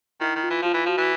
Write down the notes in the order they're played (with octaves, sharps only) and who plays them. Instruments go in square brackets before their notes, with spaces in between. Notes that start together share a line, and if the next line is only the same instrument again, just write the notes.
[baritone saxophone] D#3 [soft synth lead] E4
[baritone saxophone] D#3
[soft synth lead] F4
[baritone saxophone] E3
[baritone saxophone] F3 [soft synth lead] F4
[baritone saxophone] E3
[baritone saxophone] F3 [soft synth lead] F#4
[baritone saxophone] E3